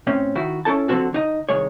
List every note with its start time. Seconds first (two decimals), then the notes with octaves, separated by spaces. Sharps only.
0.07 A2 C4 C#4
0.35 D#3 E4 F#4
0.65 C#4 E4 A4 A5
0.88 D3 F3 C4 C#4 F#4 A4
1.13 D3 D#4 D#5
1.49 C2 D#3 G#3 C#5